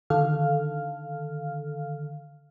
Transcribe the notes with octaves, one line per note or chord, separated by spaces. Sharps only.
D3 D#3 A4 F5 F6